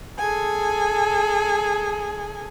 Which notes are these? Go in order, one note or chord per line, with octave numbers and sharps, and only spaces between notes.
G#4 A4 G#5